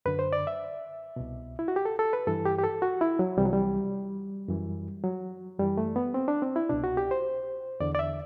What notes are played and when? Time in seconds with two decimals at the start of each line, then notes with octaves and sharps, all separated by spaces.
0.06 F#2 D3 B4
0.19 C5
0.33 D5
0.47 E5
1.16 C2 B2
1.59 E4
1.68 F#4
1.76 G4
1.85 A4
1.99 A4
2.13 B4
2.27 G2 E3 A4
2.45 G4
2.58 G4
2.64 A4
2.82 F#4
3.01 E4
3.19 F#3
3.38 C2 C3 E3 G3
3.45 F#3
3.53 G3
4.48 F#2 E3
5.04 F#3
5.58 F#2 E3 G3
5.77 A3
5.96 B3
6.14 C4
6.28 D4
6.42 C4
6.56 E4
6.69 C2 B2 D4
6.84 F#4
6.97 G4
7.11 C5
7.80 E2 D3 D5
7.95 D5
7.99 E5